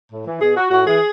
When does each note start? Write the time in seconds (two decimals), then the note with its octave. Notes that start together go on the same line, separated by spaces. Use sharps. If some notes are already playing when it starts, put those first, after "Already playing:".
0.12 A2
0.27 E3
0.41 B2 G#4
0.56 F#4
0.71 A2 F#4
0.86 E3 G#4